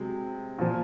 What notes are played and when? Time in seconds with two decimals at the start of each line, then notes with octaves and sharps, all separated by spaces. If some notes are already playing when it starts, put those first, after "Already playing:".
Already playing: C3 F#3 G#3
0.58 A#2 F3